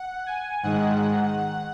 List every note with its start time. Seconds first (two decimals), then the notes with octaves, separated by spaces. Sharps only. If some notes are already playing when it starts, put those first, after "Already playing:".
Already playing: F#5
0.26 G#5
0.63 G#2 D#3 G#3 F#5
1.38 F#5